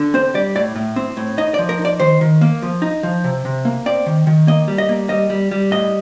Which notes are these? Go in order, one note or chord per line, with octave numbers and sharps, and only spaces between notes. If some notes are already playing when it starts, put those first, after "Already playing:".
Already playing: D3
C4 C5
G3 D5
A2 D5
A2
C4
A2
D#4 D#5
D5
F3
A#4
D#4
D5
D#3 C5
D#3
A#3
F3
D#4
F3
C3
C3
A#3
C4 D5
D#3
D#3
A#3 D#5
G3
D#5
A#3
G3 D#5
G3
G3
A2 D#5